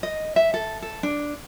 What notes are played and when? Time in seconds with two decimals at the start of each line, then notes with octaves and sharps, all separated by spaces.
0.03 D#5
0.36 E5
0.54 A4
0.82 A4
1.03 D4